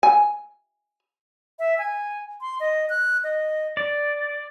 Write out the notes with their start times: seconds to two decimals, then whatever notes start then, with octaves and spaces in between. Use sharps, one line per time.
0.03 G#5
1.59 E5
1.78 G#5
2.41 C6
2.60 D#5
2.90 F#6
3.24 D#5
3.77 D5